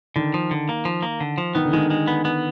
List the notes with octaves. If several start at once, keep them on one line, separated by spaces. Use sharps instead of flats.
D3 D#3
F3
D3
A#3
F3
A#3
D3
F3
D#3 B3
D3
D#3 G#3
G#3
B3
B3